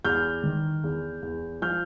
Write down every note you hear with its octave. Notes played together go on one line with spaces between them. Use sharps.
E2 F6 G6
D#3
E2
E2
F3 F6 G6